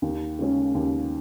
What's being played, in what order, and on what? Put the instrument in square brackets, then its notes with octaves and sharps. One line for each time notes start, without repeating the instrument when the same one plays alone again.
[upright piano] D#2
C#3 G#3 C#4
D#2